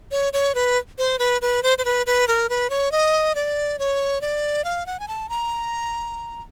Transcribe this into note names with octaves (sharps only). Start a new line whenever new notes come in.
C#5
C#5
B4
C5
B4
B4
C5
C5
B4
B4
A#4
B4
C#5
D#5
D5
C#5
D5
F5
F#5
G#5
A5
A#5